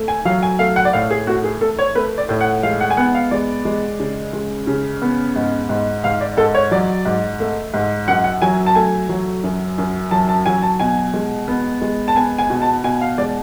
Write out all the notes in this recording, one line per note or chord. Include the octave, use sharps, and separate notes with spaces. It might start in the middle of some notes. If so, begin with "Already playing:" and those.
Already playing: A3
G#5
F#3 F5
G#5
A3 F5
F#5
D5
A2 F5
G#4
A3 F#4
G#4
A3 A4
C#5
A3 B4
D5
A2
F#5
G#3 F5
F#5
G#5
B3 F#5
F5
G#3 D5
G#3
C#3
G#3
C#3
B3
G#2
G#2
G#2 F5
D5
G#2 A4
C#5
F#3 D5
G#2
A3
G#2
F#2 F#5
F#5
F#3 G#5
A5
A3 G#5
F#3
F#2
F#2
F#3 A5
A5
F#3 G#5
A5
B2 G#5
G#3
B3
G#3
A5
B3 G#5
G#5
B2
A5
B2 G#5
F5
G#3 D5